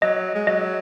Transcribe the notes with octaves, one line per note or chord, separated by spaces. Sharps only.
F#3 D#5
G#3
F#3 D#5